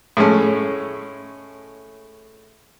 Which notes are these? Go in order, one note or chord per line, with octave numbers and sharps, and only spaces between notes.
A2 G#3 A3 C#4